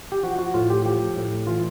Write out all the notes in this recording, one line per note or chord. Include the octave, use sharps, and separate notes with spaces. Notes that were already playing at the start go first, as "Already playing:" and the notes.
G4
F3 F#4
F#4
A2 F4
G4
F3 G4
A2
E3 F4